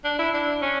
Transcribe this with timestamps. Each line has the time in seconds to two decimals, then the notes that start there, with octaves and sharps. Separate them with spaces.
0.04 D4
0.19 E4
0.34 D4
0.62 C#4